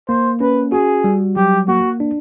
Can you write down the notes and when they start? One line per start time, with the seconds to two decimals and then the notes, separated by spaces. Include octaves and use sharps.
0.08 A#3 C5
0.41 C#4 B4
0.72 F#4 G#4
1.04 G3
1.37 F#3 G4
1.68 A#3 F#4
2.00 D4